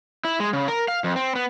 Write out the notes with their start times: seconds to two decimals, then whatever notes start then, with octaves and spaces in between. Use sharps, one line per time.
0.25 E4
0.40 G#3
0.53 C#3
0.68 A#4
0.88 F5
1.04 F2
1.16 C4
1.35 B3